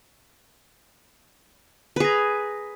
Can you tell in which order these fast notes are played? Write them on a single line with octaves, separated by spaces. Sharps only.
B4 G#4 A#5